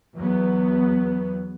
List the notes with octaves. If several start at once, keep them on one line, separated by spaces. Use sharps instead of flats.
E2 F#3 B3